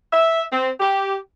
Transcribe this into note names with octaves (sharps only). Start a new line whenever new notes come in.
E5
C4
G4